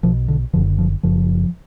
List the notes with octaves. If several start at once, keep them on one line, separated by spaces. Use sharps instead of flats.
B1 B2 F3
D3
F#1 F#2 D3 F3
F3
F#1 F#2 C#3 F3